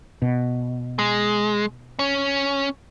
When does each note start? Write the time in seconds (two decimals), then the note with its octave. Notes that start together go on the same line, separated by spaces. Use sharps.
0.22 B2
0.99 G#3
1.99 C#4